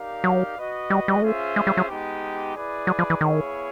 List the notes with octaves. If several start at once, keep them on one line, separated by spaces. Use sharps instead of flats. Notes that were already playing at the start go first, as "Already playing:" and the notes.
Already playing: D#4 G4 A#4 D5 F5
F#3
F#4 B4 D#5
G3
G3
G#3
A3 C#4 F4 G#4 C5 E5
G#3
G3
F#3
G#3 B3 D#4 G4
E4 G#4 B4 D5
F#3
F3
E3
D#3 B3 E4 G#4 C#5 F5